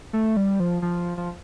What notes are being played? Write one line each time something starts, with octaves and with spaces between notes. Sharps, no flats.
A3
G3
F3
F3
F3